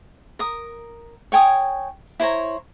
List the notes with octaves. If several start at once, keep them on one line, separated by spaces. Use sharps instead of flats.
A#4 D#6
C#5 G5 G#5 D#6
E4 C5 C#5 A#5